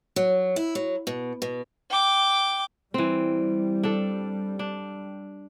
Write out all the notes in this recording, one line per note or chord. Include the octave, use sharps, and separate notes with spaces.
F#3
E4
F#3
B2
B2
G5 D6
E3 G3 C4
D4 A4
D4